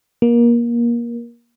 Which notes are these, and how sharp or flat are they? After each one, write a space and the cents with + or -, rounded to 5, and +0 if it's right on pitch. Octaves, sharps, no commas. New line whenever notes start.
A#3 +25